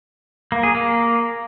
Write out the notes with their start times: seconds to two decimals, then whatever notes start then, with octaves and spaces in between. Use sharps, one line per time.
0.52 A#3
0.63 G#4
0.75 A#3